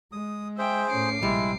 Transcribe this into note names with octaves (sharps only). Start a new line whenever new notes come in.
G#3 D#6
G#4 C5 E5 G5
A2 C#4 D6 C7
A#1 C3 G3 G#3 E4